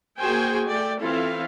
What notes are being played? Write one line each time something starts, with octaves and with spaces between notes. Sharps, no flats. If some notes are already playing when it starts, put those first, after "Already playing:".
A#3 F#4 G#4 C5 G5 G#5
A3 D5 G5
E3 C4 E4 F4 A4 F5